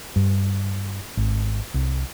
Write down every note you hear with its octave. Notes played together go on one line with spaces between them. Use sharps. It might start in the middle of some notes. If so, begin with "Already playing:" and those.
G2
G#1
C2